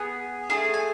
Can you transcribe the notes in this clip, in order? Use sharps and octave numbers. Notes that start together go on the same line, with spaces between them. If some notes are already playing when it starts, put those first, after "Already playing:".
Already playing: B3 G#4
A3 E4 G#4
G#5